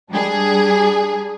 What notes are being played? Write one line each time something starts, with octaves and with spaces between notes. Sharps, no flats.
G3 D4 G#4